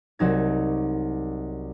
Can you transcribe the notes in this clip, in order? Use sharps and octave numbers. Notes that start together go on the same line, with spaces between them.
C2 F#3 D#4 G#6